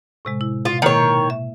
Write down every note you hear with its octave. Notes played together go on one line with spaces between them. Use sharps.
A2 C3 G#3
E4
B2 F4
B2 D#3 A#3 E4 C#5
E5